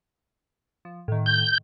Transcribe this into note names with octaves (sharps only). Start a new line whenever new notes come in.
F3
A2 D#3
G6